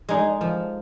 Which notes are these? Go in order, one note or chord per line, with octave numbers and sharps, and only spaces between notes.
G#3 D#4 G#4
F3